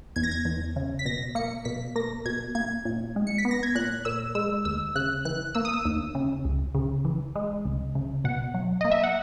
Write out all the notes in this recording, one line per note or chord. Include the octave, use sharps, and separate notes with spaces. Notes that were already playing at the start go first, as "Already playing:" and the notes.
E2 G#6
A#6
G#6
E2
C#3
B6
B2 A#6
A#3 C#7
B2 B6
A#3 A#6
B2 G#6
A#3 G#6
A#2
G#3
C#7
B6
B3
A#6
G#6
A#2 F#6
A#2 E6
G#3 E6
D#2 E6
C#3 F#6
E3 F#6
A#3 E6
D#6
E6
D#2
C#3
C#2
C#3
E3
G#3
C#2
C#3
B2 F#5
F#3
A#3 D#5
E5
F#5